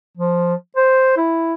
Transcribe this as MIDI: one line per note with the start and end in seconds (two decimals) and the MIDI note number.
0.17 0.54 53
0.76 1.14 72
1.17 1.54 64